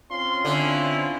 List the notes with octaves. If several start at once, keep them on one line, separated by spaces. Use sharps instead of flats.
C4 C#4 F4 C6
D3 E4